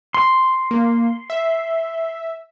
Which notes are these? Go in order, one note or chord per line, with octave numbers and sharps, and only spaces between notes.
C6
A#3
E5